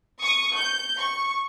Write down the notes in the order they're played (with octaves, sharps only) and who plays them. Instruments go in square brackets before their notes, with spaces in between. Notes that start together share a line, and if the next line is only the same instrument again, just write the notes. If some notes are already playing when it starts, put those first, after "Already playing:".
[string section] C#6 D#6
G6
C#6